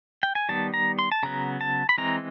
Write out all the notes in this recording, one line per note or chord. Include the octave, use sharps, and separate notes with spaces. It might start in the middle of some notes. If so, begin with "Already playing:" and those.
G5
G#5
D#3 G3 B3 A5
A#5
C6
A5
C#3 F#3 B3 A#5
A5
B5
E3 G#3 C4 A#5